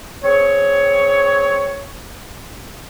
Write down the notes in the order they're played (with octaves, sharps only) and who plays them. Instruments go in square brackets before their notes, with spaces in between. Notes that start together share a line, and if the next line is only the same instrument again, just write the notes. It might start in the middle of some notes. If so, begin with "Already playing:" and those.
[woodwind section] C4 G#4 C#5